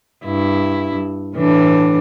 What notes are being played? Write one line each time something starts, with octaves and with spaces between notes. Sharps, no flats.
G2 E4
A2 E3 D4